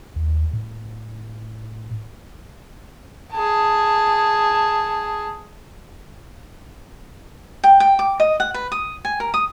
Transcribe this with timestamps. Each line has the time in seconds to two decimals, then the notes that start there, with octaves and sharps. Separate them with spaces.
0.16 D#2
0.53 A2
3.32 G#4 A5
7.64 G5
7.80 G5
7.99 D6
8.20 D#5
8.40 F#5
8.54 B4
8.72 D#6
9.05 G#5
9.20 A#4
9.34 D#6